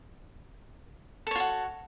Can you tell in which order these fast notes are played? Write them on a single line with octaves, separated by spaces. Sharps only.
A4 C#5 F4 F#4